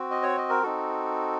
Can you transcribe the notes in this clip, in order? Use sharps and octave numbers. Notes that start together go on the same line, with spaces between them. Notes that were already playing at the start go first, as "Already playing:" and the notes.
Already playing: C4 F#4
D#5
C#5
D#5
A#4
C4 D#4 F#4 A4